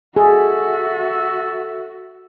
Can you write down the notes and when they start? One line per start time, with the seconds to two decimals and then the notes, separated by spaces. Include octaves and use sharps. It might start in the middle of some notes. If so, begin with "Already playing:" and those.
0.16 F#4 G#4 A4 E5